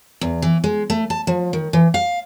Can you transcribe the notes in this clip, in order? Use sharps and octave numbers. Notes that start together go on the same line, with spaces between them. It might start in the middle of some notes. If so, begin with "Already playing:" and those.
E2
E3
G#3
A3
A5
F3
D#3
E3
F5